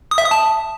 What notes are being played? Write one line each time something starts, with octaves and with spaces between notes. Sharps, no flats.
D#6
E5
D#6
A5